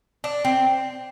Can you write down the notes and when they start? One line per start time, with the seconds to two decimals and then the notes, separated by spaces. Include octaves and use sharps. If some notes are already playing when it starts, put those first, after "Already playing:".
0.24 D4
0.45 C4